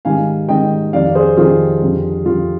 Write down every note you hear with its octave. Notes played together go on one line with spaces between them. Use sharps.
G#2 D#3 G3 F5 G#5
G#2 D#3 G3 D#5 G5
F2 D#3 G3 D5 F5
G#4 C5
F2 D#3 G3 F4 G#4
F2 D3 G3
F2 D3 G3 F4